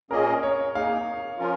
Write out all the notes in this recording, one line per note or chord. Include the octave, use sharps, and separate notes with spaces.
A#2 A#3 C#4 G#4 A#4 D#5
C#5
A#3 D#4 G#4 F5
F3 C#4 F4 A#4